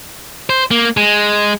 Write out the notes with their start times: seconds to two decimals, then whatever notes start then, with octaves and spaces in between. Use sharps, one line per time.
0.50 C5
0.71 A#3
0.97 G#3